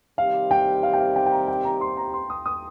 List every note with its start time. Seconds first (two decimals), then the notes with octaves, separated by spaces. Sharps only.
0.17 C3 D#3 G3 C4 G4 F5
0.51 G5
0.83 F5
0.93 G5
1.00 F5
1.16 G5
1.26 G5
1.31 A#5
1.48 G5
1.65 A#5
1.81 C6
1.97 A#5
2.14 C6
2.30 D#6
2.46 D#6